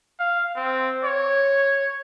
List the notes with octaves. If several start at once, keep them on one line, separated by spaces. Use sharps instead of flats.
F5
C4
C#5